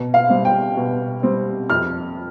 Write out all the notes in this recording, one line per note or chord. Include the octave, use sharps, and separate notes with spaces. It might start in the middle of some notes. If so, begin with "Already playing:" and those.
Already playing: B2
F5
G3 C4
G5
B2
G3 C4
F2 F6